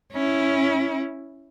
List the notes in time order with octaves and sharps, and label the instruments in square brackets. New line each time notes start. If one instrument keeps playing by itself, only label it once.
[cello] C#4 E4